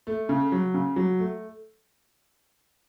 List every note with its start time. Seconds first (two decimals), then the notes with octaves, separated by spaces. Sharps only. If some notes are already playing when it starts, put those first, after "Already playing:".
0.07 A3
0.29 C#3
0.52 F#3
0.74 C#3
0.96 F#3
1.19 A3